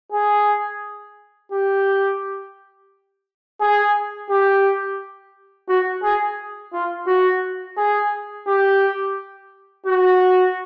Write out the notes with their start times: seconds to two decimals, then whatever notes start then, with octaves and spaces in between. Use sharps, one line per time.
0.12 G#4
1.52 G4
3.60 G#4
4.30 G4
5.68 F#4
6.03 G#4
6.73 F4
7.07 F#4
7.77 G#4
8.47 G4
9.86 F#4